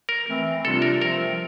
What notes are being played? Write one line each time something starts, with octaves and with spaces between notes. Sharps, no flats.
A#4
E3 A3 C4
C3 G3 D4 F4 A4
A#4
F3 A3 C4 A#4